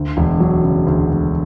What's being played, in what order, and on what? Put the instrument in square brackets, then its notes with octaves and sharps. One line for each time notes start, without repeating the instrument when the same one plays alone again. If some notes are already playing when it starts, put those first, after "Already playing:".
Already playing: [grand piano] D2
E1
F#3
C#3
D2
E1